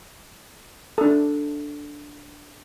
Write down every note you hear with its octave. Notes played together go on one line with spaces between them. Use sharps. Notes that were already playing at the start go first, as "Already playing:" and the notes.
D4 A4